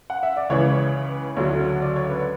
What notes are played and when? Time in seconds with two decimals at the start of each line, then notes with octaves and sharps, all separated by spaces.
0.10 F#5
0.23 E5
0.37 D5
0.50 C#2 C#3 E3 C#5
1.37 D2 D3 F#3 C#5
1.82 D5
1.96 C#5
2.09 B4